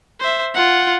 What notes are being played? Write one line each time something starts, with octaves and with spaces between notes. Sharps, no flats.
C5 E5
F4 F#5